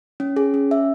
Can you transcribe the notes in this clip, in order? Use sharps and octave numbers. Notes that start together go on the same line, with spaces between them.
C#4
G#4
C#4
E5